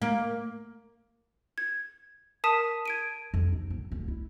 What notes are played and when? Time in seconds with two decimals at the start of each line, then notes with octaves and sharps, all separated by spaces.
0.02 A#3
1.58 G#6
2.44 A#4 A5 D#6 B6 D#7 E7
2.86 G#6 D7 D#7
3.34 F2
3.53 D#4
3.70 A#1
3.92 D1
4.08 E4